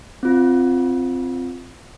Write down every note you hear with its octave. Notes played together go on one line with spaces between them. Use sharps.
C4 F4